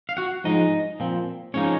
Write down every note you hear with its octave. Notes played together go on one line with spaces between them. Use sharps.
F5
F#4 F#5
G#2 F3 G#3 D#4 D#5
A#2 F3 C4
G#2 F3 A#3 C#4 D#4 C#5